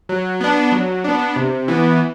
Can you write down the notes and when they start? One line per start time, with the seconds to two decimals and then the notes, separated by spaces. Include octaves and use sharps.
0.09 F#3
0.41 B3 D4
0.72 F#3
1.04 B3 D4
1.36 C3
1.68 E3 B3